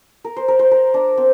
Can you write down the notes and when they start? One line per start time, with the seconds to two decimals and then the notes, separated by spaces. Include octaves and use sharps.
0.24 A#4
0.36 C5
0.48 A#4
0.59 C5
0.71 A#4
0.94 D4
1.17 C4